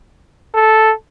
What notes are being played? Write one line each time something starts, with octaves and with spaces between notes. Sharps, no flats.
A4